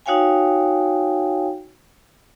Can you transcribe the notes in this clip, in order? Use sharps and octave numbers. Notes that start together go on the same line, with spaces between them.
D#4 F#4 C#5 F5 G5 G#5